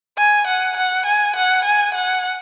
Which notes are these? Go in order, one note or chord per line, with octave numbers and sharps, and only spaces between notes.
G#5
F#5
F#5
G#5
F#5
G#5
F#5